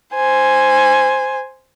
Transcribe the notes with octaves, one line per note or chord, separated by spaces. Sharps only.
C5 G#5